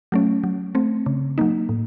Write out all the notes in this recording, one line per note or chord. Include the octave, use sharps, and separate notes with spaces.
F#3 A3 C#4
F#3
A3 C4
C#3
F#3 A#3 D#4
A2